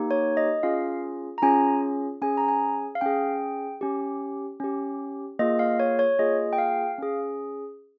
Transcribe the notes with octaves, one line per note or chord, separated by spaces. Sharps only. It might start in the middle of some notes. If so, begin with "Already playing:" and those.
Already playing: A#3 D#4 G4
C#5
D#5
C#4 F4 G#4 F5
A#5
C#4 F4 G#4 G#5
C#4 G#4 G#5
A#5
G#5
F5
C#4 G#4 G5
C#4 G4
C#4 G4
A#3 F4 G#4 D#5
F5
C#5
C#5
A#3 F4 G#4 D#5
G5
F5
C#4 G#4